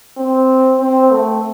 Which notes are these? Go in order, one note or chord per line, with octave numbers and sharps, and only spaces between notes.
C4
C4
A3